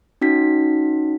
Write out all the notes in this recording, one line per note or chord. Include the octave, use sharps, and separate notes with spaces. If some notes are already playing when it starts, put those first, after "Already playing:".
C#4 D#4 F#4 B6